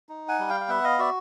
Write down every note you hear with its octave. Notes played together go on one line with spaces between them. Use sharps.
D#4
F#5 G#5
G3
F5 G5
F5
B3 E5 F#5
D#5 F5
F#4 D5 E5